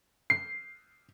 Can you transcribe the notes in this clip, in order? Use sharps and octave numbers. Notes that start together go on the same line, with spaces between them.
C7